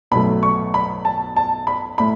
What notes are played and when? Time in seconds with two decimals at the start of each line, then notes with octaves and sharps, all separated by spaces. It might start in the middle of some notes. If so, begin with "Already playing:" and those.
0.11 B1 B2 F#3 A3 B5
0.43 C#6
0.74 B5
1.05 A5
1.37 A5
1.67 B5
1.98 A2 B5